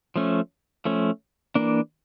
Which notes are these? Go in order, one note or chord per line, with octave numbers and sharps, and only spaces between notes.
F3 A3 C#4
F3 A3 C#4
E3 A#3 D4